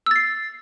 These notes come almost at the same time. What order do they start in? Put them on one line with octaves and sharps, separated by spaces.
E6 A6 C7